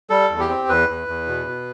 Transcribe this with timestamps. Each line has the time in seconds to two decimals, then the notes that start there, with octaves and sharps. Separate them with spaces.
0.10 G3 A4
0.30 E2
0.40 G4
0.49 C4
0.69 E2 B4
0.89 E2
1.08 E2
1.28 B2
1.47 B2